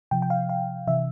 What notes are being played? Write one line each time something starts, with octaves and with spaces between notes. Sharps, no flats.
C3 F3 G5
G5
F5
F5
C3 E3 E5